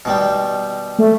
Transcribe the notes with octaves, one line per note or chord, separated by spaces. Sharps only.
B2 D#3 G3
A3